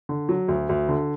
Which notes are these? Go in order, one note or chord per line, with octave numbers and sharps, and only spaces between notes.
D3
F#3
D2
D2
D3